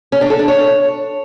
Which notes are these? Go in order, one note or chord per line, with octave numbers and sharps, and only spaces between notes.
C#4
D4
A4
D4
C#5